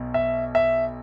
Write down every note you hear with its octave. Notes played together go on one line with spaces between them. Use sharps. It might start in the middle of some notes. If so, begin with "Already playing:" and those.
Already playing: B1 B2
E5
E5